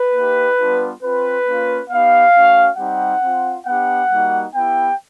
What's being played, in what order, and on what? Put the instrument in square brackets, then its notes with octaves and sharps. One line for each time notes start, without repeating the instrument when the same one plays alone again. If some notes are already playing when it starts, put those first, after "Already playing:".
Already playing: [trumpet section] B4
A#3 D#4 G4
G3 B3 D4 F4
C4 F4 B4
A#3 C#4 F4
B3 D#4 G4 F5
A3 C#4 F#4
G3 C4 D#4 G4 F#5
C4 F4
B3 D4 G4 F#5
G3 A#3 D#4 F#4
B3 E4 G4 G5